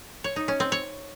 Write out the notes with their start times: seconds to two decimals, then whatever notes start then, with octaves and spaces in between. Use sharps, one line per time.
0.24 C#5
0.36 D#4
0.48 C#4
0.60 C4
0.72 C#5